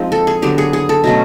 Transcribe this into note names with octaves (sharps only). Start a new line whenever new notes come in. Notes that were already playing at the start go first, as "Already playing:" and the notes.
Already playing: F3 G#3 C4 D#4
A4
G#4
D3 F#3 B3 G4
G#4
G#4
A4
B2 F#3 A3 C#4